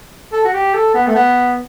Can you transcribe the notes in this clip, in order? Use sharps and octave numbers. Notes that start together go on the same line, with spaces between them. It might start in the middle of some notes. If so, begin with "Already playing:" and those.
A4
F#4
G4
A4
B3
A3
B3